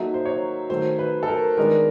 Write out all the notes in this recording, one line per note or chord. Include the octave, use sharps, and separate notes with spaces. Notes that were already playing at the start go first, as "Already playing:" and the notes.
Already playing: F#3 A#3 D#4 F#4 A4 E5
C5
C#5
D#3 F#3 A3 C5
B4
A4
A#4
D#3 G#3 B3 D4 A#4